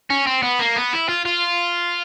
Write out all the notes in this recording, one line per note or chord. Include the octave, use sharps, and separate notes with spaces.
C#4
C4
B3
A#3
B3
E4
F4
F4